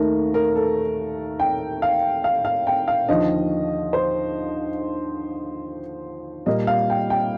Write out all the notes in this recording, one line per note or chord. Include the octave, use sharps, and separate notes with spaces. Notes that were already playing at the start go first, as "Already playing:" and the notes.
Already playing: D#2 D#3 A3 A#4
A#4
A4
G5
F5
F5
F5
G5
F5
D#2 D3 F3 D#5
C5
A#2 G3 A#3 D#5
F5
G5
G5